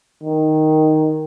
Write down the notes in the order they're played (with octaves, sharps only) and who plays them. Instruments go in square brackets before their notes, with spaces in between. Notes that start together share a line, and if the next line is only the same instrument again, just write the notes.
[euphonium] D#3